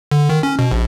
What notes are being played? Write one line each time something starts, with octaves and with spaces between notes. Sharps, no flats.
D3
D#3
C#4
B2
A#1